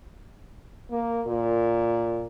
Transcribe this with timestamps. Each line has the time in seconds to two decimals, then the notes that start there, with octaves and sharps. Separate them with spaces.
0.91 A#3
1.27 A#2